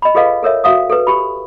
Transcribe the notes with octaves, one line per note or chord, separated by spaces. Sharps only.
D#5 B5
F4 G#4 A4 B4 D#5 F5
A4 A#4 C#5 E5
F#4 E5 F5 D#6
A4 B4
G4 B5